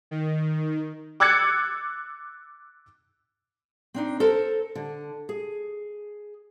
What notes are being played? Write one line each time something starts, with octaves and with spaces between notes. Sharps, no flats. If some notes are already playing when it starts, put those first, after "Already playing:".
D#3
D6 E6 F#6 G#6 A6 C#7
C4 D4 D#4
A4 A#4 C5
D3
G#4